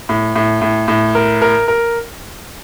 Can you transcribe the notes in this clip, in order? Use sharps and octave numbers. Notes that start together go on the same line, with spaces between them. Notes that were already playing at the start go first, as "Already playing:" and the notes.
A2
A2
A2
A2
A#4
A#4
A#4